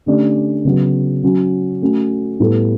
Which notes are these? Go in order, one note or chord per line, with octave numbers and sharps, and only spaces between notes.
D3 A3 C#4 G4 D5
C#3 F#3 B3 F#4
F#3 C#4 F#4
A3 C#4 F#4
A2 G3 B3 E4 A4